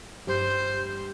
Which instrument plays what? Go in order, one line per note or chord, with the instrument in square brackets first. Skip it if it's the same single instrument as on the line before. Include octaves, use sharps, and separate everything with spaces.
[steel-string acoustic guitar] G2 G3 [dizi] C5